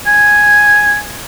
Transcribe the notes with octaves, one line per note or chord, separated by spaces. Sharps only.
G#5